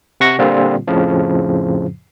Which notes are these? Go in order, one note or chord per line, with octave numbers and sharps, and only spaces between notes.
C3 F#5 C#6 A#6
A#2 D3 G3 C4 F4
F2 A2 C#3 F3